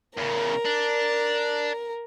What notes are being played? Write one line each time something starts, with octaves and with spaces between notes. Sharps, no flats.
E2 C#3 A#4
D4